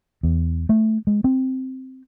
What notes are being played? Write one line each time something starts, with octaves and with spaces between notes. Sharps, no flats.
E2
A3
G#3
C4